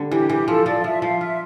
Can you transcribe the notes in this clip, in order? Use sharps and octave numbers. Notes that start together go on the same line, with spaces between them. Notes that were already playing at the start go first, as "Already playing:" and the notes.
Already playing: D3 G3
E3 G4
E3 G4
F3 A4
F3 D5
F5
F3 E5
F3 F5
F4 E5